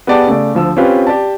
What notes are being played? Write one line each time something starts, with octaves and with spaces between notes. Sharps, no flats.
B3 G4 G#4 D5 F#5 A5
C#3 A3 D5
D2 F3 E6
C4 C#4 F4 G4 B4
G4 D5 A5